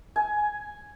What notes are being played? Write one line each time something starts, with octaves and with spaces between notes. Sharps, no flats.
G#5